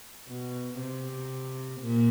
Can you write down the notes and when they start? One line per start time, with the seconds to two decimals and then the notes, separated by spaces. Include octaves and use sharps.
0.28 B2
0.79 C3
1.81 A#2